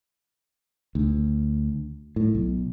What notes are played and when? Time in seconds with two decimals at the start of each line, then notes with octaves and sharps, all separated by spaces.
0.95 D2
2.16 A2
2.35 B1